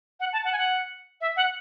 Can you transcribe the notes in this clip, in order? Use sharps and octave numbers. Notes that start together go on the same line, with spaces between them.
F#5
A5
F#5
G#5
F#5
E5
F#5